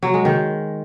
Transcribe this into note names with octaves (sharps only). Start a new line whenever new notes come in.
F#3
G#3
D#3